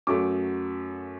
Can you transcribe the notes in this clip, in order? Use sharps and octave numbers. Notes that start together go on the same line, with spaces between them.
F#2 F#3 A3 D6